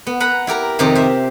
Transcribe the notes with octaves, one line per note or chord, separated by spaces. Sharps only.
B3
B4 F#5 A#5 B5
E4 G4 A#4 A#5
F2 C3 D#3 G4 C5 A#5
C5 E5